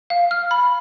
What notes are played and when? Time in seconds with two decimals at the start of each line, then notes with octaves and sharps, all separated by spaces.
0.10 F5
0.31 F6
0.51 B5